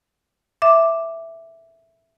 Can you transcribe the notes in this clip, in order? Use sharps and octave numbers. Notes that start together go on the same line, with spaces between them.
E5 D6